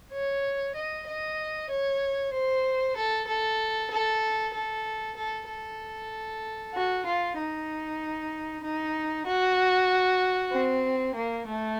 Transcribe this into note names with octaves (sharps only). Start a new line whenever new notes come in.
C#5
D#5
D#5
C#5
C5
A4
A4
A4
A4
A4
A4
F#4
F4
D#4
D#4
F#4
C4
A#3
A3